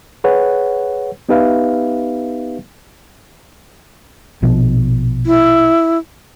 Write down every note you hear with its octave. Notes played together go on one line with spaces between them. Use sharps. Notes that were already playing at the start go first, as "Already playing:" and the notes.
G#4 B4 C#5 F#5
B3 D#4 G4 B4 E5 F5
A#1 B2 F3
E4